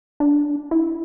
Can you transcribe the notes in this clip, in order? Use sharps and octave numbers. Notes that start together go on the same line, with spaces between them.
D4
E4